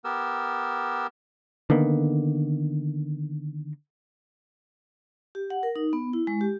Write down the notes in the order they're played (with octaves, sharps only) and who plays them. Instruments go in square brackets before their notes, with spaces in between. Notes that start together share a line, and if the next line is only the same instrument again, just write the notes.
[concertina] B3 G4 A#4 E6
[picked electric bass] D3 D#3 A#3 B3
[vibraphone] G4
F#5
A#4
D#4
B3
E4
G#3
G4